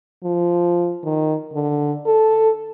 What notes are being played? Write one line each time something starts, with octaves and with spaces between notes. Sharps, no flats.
F3
D#3
D3
A4